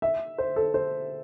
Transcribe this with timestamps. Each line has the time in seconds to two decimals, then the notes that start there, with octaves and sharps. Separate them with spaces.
0.02 E5
0.38 C5
0.56 A4
0.74 C5